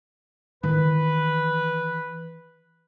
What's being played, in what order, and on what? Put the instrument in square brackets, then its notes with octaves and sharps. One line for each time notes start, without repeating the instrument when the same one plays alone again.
[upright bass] D#3 E3 [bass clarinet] B4